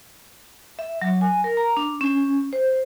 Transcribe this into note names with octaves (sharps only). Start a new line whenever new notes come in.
E5
F#3
G#5
A#4
A#5
D4
C#4
C5